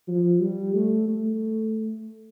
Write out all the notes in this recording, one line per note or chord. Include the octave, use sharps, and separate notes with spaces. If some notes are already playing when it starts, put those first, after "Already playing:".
F3
G3
A3
A3